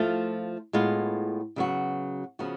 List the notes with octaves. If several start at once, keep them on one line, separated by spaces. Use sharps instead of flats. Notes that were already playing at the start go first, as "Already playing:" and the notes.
Already playing: F3 A3 F4
A2 G#3 B3 F4
C#3 F#3 B3 F#4
C#3 F3 B3 F#4